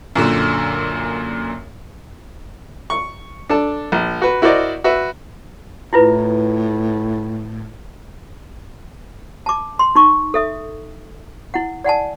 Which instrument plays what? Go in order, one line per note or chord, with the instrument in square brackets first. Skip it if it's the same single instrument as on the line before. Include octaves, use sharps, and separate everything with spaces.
[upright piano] F#2 A#2 D3
[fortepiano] C#6
D4 A4 A5
A#1
F#4 B4
E4 F#4 A#4 C5 D5 D#5
F#4 B4 E5
[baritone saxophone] A2 [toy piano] E4 F4 B4
[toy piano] A5 D6
C6
D#4 C#6
A4 E5 D#6
E4 F#5
D5 F#5 G#5 A5